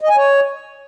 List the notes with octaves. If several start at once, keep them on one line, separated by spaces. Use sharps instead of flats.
D#5
G#5
C#5